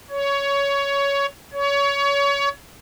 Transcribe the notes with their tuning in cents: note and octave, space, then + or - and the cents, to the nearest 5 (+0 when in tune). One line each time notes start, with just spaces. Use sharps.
C#5 +15
C#5 +25